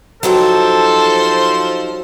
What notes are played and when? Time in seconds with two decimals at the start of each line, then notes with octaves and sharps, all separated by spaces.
0.23 F3 F#3 D#4 G4 A4 C5